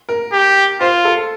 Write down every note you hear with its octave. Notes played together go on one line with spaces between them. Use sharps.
A#4
G4
F4 C5
A4